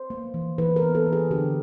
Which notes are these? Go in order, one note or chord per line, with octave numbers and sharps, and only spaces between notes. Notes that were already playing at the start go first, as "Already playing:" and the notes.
Already playing: C5
A#3
E3
E3 B4
A#4
B3
A4
E3
G#4
D3 G4